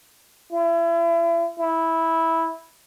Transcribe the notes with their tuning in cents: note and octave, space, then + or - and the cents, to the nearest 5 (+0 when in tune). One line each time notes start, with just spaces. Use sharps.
E4 +35
E4 -10